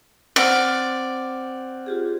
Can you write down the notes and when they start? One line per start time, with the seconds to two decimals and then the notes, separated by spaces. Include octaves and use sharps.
0.36 C4 D5 F#5 F6
1.86 F4 G4 G#4